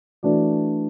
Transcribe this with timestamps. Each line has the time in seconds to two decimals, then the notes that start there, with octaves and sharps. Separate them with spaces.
0.23 E3 A3 D4 F#4 D5